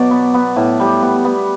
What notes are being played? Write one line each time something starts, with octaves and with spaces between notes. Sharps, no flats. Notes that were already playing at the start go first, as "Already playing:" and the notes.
Already playing: B2 F#3 D5
B3
B3
A2
G3
B3
B3